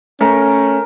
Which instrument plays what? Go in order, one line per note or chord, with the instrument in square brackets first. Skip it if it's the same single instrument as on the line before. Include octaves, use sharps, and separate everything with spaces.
[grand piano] A3 [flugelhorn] C#4 [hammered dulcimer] A#4